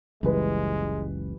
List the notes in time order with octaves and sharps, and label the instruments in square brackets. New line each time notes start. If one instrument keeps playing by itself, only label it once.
[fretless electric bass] F#1 C#2 [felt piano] E3 G3 B4 [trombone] G#3